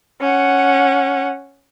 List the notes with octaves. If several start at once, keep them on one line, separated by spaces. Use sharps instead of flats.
C#4 F#5